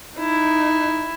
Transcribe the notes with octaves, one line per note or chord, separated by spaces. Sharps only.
D#4 E4